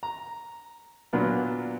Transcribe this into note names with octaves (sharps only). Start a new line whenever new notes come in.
A#5
A#2 F#3 B3 D4 F4